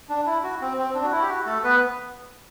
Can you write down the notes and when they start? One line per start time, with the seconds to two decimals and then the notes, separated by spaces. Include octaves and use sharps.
0.09 D4
0.26 E4
0.43 F#4
0.61 C4
0.78 C4
0.95 D4
1.04 F#4
1.12 E4
1.22 G4
1.29 F#4
1.46 A3 A4
1.63 B3 B4